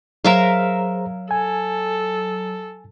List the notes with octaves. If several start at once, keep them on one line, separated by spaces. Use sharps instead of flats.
F#3 G#4 A#4 C5 E5 F5 A#5
A4 G#5